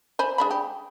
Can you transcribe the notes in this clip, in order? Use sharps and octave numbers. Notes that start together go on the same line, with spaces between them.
C5 G#5 B5
G#3 D4 B5
G4